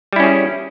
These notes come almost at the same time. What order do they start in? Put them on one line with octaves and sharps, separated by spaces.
G3 E4 C#4 G#4